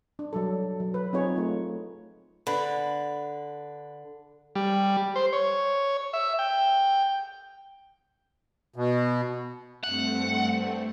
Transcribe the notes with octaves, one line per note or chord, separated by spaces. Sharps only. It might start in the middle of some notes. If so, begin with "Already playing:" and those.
D4
F#3 G3 A4
F#3
B4
F#3 C4 D#4 F4 G#4 C#5
A3 D#4 F4
D3 B4
G3
C5
C#5
E5
G5
B2
G2 A3 C4 F#5